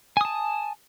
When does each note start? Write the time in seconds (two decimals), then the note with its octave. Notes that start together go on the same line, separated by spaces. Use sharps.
0.17 G#5
0.21 D#6
0.25 A5